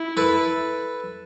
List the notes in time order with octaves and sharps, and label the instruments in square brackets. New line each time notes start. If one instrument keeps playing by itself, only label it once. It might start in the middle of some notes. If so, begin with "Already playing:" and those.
Already playing: [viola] E4
[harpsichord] A4 B4